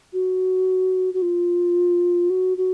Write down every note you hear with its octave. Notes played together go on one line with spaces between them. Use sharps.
F#4
F#4
F4
F#4
F#4